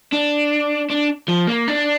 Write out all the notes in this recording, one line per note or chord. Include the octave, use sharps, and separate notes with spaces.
D4
D4
F3
A#3
D4